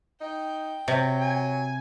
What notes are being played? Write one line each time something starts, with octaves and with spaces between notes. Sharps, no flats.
D#4 G5
C3 F#3
G#5